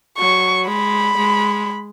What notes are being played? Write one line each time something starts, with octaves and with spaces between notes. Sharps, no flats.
F#3 C#6
G#3 B5
G#3